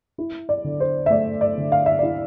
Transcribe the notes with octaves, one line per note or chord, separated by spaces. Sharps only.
E4
D5
D3
C5
E5
A3 D5
D5
D3
F5
E5
E4 D5